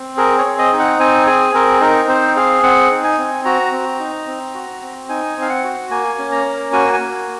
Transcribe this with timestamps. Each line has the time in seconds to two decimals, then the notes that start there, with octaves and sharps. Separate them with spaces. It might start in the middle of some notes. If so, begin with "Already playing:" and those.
Already playing: C4
0.17 G#4 A#4
0.38 C#5
0.45 C4
0.59 D#5
0.73 D#4
0.79 F#5
0.99 C4 G#5
1.27 G#4 G#5
1.54 C4 A#4
1.81 D#4 A#4
2.08 C4 C5
2.36 G#4 F5
2.63 C4 F#5
2.91 D#4
3.04 G#5
3.19 C4
3.45 F#4 A#5
3.72 C4
4.00 D#4
4.27 C4
4.55 F#4
4.82 C4
5.09 D#4 G#5
5.37 C4
5.42 F5
5.50 F#5
5.64 F#4
5.90 A#3 G#5
6.18 C#4
6.32 A#5
6.45 A#3
6.73 F#4 G#5
6.93 G#5
7.00 A#3